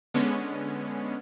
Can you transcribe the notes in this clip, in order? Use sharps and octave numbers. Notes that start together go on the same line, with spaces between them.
D3 G#3 B3 C#4